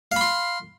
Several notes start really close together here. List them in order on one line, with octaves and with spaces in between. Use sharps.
F5 B5 C6